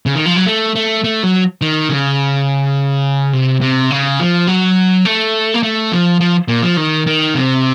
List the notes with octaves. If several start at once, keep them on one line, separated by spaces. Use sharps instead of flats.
C#3
D#3
F3
F#3
A3
A3
A3
F#3
D#3
C#3
C3
C3
C#3
F3
F#3
A3
A#3
A3
F3
F3
A#2
F3
D#3
D#3
C3